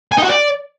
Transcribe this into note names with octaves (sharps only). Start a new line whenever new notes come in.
G#5
D#4
F#4
D5